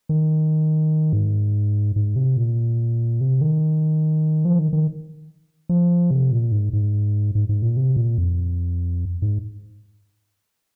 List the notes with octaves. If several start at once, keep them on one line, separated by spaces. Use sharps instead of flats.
D#3
G#2
G#2
C3
A#2
C3
D#3
F3
D#3
D#3
F3
C3
A#2
G#2
G#2
G#2
G#2
A#2
C3
A#2
F2
G#2